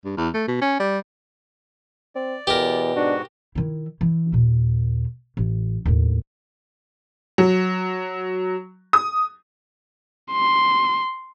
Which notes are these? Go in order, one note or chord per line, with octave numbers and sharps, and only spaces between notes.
G2
E2
A3
B2
C#4
G3
C4 D5
E2 B2 G4 A#4
G#2 D4 F#4
D#3 E4
E3
D#2 A#2
A1
D#2 A2
F#3
D#6
C6